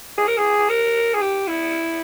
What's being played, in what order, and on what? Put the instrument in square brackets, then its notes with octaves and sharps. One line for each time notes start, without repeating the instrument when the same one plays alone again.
[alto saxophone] G#4
A#4
G#4
A#4
G#4
G4
E4